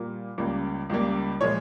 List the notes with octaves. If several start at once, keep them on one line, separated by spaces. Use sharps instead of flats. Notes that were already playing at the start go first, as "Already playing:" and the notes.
Already playing: A#2 G3 A#3
C#2 C#3 G3 A#3
C#2 C#3 G3 A#3
A#2 F3 G#3 C#5